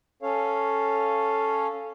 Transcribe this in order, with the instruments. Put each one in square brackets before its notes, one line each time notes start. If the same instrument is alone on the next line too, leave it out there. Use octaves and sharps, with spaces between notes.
[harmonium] C#4 A4 C#5 F5